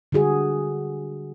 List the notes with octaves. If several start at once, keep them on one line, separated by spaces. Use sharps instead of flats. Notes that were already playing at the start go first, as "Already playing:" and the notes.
D3 G3 F#4 G#4